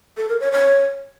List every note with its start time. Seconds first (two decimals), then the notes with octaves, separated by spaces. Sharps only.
0.17 A4
0.29 A#4
0.40 C#5
0.52 C#5